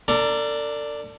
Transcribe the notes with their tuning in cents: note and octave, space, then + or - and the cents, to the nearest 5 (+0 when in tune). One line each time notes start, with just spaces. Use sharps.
D4 +0 A4 +45 A#5 +0